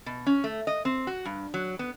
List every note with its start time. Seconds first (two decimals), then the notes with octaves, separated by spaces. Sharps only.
0.06 B2
0.27 C#4
0.44 A3
0.67 D#5
0.85 C4
1.07 F#4
1.25 G2
1.54 F#3
1.79 B3